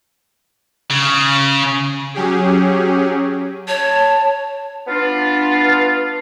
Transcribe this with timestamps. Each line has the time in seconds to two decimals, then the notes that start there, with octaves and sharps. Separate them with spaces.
0.90 C#3
2.14 F#3 C#4 G4 G#4
3.68 C#5 A5
4.88 B3 D4 F4